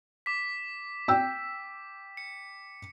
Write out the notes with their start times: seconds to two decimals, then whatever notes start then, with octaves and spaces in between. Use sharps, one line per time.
0.26 D6 B6
1.08 G5 E6
2.17 C#7